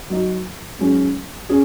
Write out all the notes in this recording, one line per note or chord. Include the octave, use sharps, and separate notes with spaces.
F#3 D#4 F#4
G#2 F#3 C#4 G#4
C#4 G#4